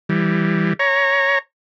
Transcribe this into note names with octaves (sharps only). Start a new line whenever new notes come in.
E3 G3
C#5 A#5